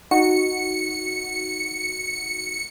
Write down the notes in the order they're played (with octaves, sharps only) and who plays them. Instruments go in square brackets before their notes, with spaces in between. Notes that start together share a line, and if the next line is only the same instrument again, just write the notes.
[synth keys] D#4 F#4 [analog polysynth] C#7